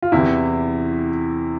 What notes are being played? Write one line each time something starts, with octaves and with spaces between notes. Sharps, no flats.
F4
E2 C3 E3 E4